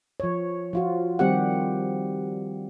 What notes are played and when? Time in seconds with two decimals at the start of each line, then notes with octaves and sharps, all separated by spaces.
0.20 F3 C#5
0.73 F3 F4 F#4
1.19 D#3 G3 C4 G4 F#5